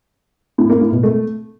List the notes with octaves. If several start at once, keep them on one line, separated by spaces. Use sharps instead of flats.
A2
A#3
A2
B2
A3